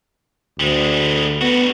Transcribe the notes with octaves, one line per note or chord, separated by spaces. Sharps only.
D2 G3 G#3
G3 B3 F#4